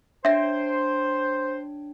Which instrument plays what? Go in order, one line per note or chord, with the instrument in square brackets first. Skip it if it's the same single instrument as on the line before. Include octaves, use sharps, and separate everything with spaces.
[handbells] D4 C#5 G5 [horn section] C5 [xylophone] E5 A#6